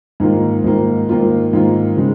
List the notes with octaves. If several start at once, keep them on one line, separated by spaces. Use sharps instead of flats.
G#2 D#3 A#3 F4
G#2 D#3 A#3 F4
G#2 D#3 A#3 F4
G#2 D#3 A#3 F4
C#3 G#3